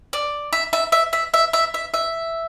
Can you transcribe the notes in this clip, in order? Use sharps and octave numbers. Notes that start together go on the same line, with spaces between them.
D5
E5
E5
E5
E5
E5
E5
E5
E5